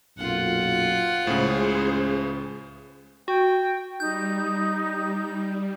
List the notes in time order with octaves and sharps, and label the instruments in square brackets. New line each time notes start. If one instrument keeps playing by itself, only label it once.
[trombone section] B1 F#2 A#2 [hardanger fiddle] F4 F#5
[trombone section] C#2 [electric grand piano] A2 C#3 [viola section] G#4 C5
[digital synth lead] F#4 [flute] G5
[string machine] G3 [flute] D#4 [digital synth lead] G6